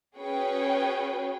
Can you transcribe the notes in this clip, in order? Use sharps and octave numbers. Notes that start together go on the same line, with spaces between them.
C#4 F#4 G#4 B4 C#5 G5